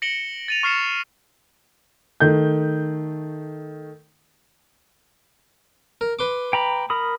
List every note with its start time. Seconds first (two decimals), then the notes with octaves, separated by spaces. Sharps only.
0.02 A#6 C#7 D7 E7 F#7 G7
0.48 A6 D#7 F7
0.63 C#6 F6 C7 C#7 E7
2.20 D#3 A3 G6
6.01 A#4
6.19 B4 C6 D6
6.53 G5 A#5 B5
6.90 A#4 B5 D#6